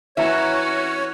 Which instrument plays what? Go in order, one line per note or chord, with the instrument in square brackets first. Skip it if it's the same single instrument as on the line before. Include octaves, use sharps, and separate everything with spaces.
[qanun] E3 A#4 B4 [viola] C#4 F#4 [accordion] C#5 [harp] E5 A#5